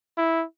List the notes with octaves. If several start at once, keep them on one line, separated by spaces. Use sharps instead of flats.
E4